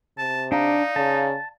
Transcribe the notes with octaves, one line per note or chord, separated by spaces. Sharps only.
C3 A5
D4 D#4 D5 F5 A#5
C#3 A5